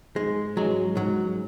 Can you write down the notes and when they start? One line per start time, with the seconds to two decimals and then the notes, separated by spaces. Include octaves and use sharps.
0.15 G#2 G#3
0.57 E3 F#3 G#3 C#4
0.97 G#2 F#3